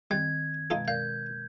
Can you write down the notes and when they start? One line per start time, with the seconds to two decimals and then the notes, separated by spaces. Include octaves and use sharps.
0.11 D#3 G3 C4 G#6 A6
0.70 B2 G#3 D#4 F4 A4
0.88 A#4 D5 F5 G6